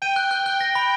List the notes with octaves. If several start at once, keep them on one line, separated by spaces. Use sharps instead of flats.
G5 D#7
F#6
F#6
F#6
A#6
B5